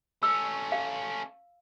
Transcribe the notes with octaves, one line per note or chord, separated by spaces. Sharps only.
A3 C#4 E6
F5